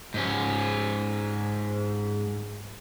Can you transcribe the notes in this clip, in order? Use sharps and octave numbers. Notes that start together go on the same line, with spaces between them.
G#2 C#4